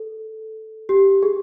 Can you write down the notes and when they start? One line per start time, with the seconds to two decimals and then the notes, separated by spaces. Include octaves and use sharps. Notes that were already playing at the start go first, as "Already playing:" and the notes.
Already playing: A4
0.89 G4
1.23 G#4